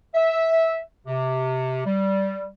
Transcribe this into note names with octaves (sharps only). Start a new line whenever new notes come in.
E5
C3
G3